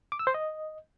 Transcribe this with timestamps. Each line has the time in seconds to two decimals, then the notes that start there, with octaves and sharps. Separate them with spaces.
0.12 D6
0.19 E6
0.27 C5
0.34 D#5